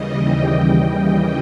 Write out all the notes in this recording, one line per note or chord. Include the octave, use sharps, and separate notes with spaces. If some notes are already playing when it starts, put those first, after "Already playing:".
Already playing: D#2 C#3 E3 G3 D#5
G5
G5